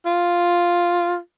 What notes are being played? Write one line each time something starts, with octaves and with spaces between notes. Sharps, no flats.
F4